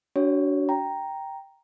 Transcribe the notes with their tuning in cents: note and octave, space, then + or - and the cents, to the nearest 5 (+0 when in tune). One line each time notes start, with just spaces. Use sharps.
D4 -30 F#4 +20 C#5 +5
G5 +0 A#5 +0